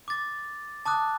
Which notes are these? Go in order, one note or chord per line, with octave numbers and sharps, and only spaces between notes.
D6 A6
A5 D6 D#6 F#6